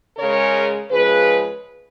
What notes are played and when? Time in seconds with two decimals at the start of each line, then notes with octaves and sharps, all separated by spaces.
0.17 C#3 G#3 A#4 C#5
0.90 C#3 F3 G#3 G#4 B4